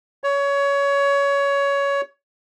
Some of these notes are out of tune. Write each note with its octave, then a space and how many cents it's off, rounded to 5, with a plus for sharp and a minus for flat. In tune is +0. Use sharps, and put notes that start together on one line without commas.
C#5 +20